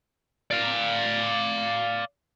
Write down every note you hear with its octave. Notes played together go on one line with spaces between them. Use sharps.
D5 F5